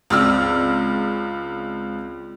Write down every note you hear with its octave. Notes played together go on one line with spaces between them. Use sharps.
C#2 C4 D5 E6 F6